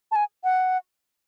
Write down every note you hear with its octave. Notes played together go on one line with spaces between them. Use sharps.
A5
G#5
F#5